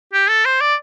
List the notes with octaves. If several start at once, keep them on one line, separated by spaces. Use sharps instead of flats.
G4
A4
C5
D5